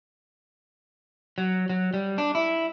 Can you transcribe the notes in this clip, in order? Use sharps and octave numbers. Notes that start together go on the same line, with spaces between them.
F#3
F#3
G3
D4
E4